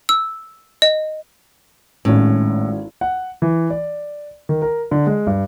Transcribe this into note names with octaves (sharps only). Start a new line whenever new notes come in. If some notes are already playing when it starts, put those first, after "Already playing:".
E6
D#5
G#1 A2 C#4
F#5
E3
D5
D#3
A#4
D3
G#3
G2